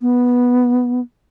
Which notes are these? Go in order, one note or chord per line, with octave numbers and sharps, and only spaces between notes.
B3